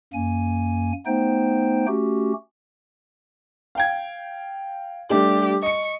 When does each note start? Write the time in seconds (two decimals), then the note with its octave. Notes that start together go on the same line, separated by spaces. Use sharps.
0.14 F#2 A#3 G#5
1.06 A3 B3 D#4 C5 G5
1.88 A3 C#4 F#4 G4
3.75 F5 G5 G#6
5.10 G3 A3 D4 G4
5.62 D#5 C#6 C#7